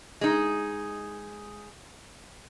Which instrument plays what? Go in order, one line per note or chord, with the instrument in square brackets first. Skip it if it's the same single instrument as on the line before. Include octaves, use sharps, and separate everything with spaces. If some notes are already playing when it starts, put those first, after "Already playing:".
[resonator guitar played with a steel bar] G#3 D#4